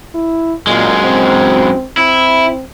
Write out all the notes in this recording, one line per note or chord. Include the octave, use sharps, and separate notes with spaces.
E4
F#2 A#2 G#3
C4
C4 E4